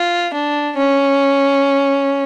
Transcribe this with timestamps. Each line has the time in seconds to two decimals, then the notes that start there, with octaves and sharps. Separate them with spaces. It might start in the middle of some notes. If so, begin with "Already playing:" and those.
Already playing: F4
0.34 D4
0.77 C#4